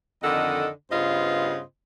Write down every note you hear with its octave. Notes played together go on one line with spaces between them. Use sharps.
F2 D3 D#3 A4 D#5 F#5
G2 C#3 B3 F4 C5 D#5